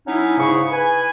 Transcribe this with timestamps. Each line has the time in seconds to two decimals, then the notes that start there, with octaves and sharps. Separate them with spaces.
0.07 F#3 C#4 D#4 E4
0.38 G#2 C#3 E4 C#6 D#6
0.71 B4 G#5